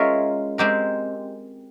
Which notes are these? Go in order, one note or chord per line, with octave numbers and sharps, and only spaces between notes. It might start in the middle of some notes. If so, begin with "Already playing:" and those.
Already playing: G#3 C#4 F4 A#4 E5
G#3 C4 G4 A#4